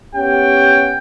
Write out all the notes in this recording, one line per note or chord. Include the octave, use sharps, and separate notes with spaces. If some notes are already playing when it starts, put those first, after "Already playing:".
B3 C#4 G4 F#5 G5